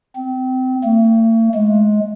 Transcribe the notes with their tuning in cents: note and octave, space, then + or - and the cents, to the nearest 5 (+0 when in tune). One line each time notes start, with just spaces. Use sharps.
C4 -25
A3 +45
G#3 +20